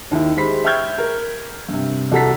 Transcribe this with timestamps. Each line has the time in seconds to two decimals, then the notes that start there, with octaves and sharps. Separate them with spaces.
0.11 D#2 D#3 E4
0.36 G#3 G4 C5 B5 B6
0.64 E5 G5 C#6 F6 G6 G#6
0.98 A#4
1.68 G2 C3
2.12 C2 F#4 A4 A#5 B6